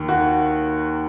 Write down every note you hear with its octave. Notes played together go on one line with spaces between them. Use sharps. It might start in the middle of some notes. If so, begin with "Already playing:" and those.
Already playing: D#2 D#3
F#4